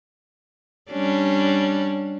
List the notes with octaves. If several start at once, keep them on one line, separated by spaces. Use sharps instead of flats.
G3 C#4 D4